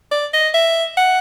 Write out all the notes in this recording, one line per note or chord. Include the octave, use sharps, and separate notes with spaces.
D5
D#5
E5
F#5